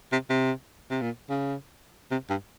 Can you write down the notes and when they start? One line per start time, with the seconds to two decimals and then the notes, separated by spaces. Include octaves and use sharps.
0.12 C3
0.30 C3
0.91 C3
1.02 A#2
1.30 C#3
2.11 C3
2.30 G2